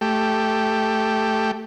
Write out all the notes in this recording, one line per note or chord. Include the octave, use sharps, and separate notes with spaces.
A3 G4